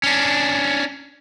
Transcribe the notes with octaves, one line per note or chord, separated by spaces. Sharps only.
C#4 D4